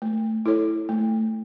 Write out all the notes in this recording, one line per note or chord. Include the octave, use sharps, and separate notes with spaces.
A3
E4 A4 C#5
A3